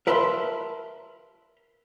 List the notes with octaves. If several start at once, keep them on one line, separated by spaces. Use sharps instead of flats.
A#4 B4 E5 A5 B5 C6